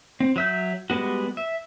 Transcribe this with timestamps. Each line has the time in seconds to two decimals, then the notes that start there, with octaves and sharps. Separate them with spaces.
0.20 C4
0.36 F#3 E5 G6
0.90 G3 G#3 B3 F#4
1.37 E5